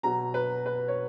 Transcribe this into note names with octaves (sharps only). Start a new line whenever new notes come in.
B2 F#3 A#5
B4
B4
C#5